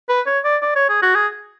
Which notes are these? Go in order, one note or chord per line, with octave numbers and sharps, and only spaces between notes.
B4
C#5
D5
D5
C#5
G#4
F#4
G#4